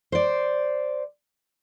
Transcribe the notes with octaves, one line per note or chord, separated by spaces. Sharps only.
C5 D5